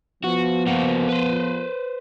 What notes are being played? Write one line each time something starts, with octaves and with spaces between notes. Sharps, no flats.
F3 B3 F#4
A#3 F#4
B4 C5